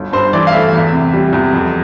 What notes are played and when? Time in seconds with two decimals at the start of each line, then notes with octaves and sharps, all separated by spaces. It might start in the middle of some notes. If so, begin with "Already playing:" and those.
Already playing: G1 D2
0.13 G2 C5
0.33 E3 D5
0.47 F5
0.52 A3 E5
0.73 E2
0.92 C3
1.13 G3
1.33 E2
1.53 F2